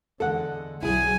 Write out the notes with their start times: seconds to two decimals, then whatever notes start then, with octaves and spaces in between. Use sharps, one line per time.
0.20 E2 D3 G#3 A4 F#5
0.83 B1 F#3 E4 G#4 G#5